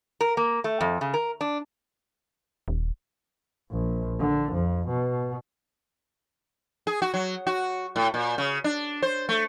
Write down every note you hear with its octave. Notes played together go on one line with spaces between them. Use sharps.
A#4
A#3
A3
F2
C#3
A#4
D4
D#1
A#1
D3
F2
B2
G#4
F#4
F#3
F#4
A2
A#2
C#3
D4
C5
A3